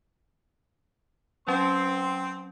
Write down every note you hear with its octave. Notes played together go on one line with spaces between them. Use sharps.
F#3 C4 C#4 C6